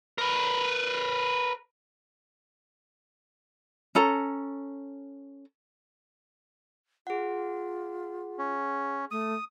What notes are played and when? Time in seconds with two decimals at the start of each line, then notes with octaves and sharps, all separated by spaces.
0.18 A#4 B4
3.95 C#4 A4 A#5
7.07 F4 G#4 F#5
8.38 C#4
9.11 A3 D#6